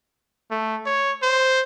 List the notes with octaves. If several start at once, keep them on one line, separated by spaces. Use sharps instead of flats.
A3
C#5
C5